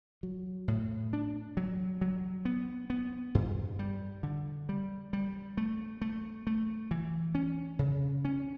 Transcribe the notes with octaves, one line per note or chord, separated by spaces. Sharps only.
F#3
A2
D4
F#3
F#3
B3
B3
G2
G3
D3
G3
G3
A3
A3
A3
E3
C#4
C#3
C#4